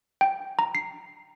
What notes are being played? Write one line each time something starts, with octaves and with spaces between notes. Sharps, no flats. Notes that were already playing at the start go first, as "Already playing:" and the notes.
G5
A#5
C7